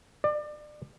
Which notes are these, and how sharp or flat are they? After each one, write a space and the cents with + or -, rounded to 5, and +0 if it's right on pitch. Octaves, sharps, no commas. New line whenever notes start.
D5 +30